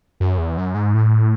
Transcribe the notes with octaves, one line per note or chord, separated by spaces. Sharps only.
F#2
E2
F#2
G#2
A2